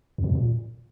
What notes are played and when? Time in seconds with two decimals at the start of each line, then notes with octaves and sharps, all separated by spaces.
0.18 E2
0.24 A#2
0.30 E2
0.35 A#2